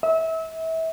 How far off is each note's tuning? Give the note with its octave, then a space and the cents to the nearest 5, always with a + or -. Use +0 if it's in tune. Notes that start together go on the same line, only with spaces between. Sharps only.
E5 -30